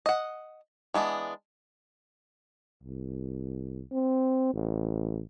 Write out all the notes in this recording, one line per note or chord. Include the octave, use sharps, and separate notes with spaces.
D#5 F#5
E3 G#3 B3 D4
C2
C4
A1